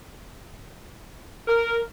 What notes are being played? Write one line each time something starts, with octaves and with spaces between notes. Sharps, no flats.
A#4